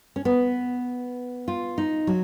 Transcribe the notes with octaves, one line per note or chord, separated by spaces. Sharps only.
C#4
B3
F4
D#4
F#3